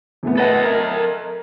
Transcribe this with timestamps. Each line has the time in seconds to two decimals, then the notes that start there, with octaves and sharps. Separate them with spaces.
0.23 E2 A3 B3
0.37 A4 B4 D#5 E5 F#5
0.64 A#4 E5 G#6